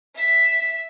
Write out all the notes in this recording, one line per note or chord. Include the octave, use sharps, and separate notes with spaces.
E5 B6